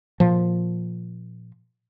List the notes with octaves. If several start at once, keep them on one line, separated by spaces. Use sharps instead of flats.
A#2 F3